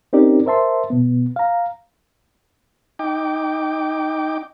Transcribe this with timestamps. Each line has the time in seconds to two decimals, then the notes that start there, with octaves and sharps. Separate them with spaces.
0.13 C4 C#4 D#4 G4 A#4 D5
0.46 A#4 C5 E5 A5 C6
0.90 B2 B3
1.36 F5 A#5
2.99 D#4 G5 D6